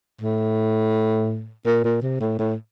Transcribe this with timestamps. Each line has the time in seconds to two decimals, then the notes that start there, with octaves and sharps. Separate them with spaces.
0.21 A2
1.66 A#2
1.84 A#2
2.02 C3
2.20 A2
2.39 A2